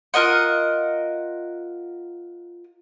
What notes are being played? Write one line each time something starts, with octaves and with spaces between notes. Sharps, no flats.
F4 A#4 D#5 F#5